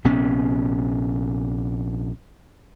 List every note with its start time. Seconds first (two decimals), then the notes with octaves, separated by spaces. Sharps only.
0.04 A#1 C3 B3 C#4